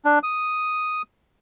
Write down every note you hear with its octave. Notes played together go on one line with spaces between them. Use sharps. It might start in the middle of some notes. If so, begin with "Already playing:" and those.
D4
D#6